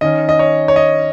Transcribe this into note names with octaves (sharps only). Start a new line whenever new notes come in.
D#3 C#4 D#5
D#5
C#5
C#5
D#5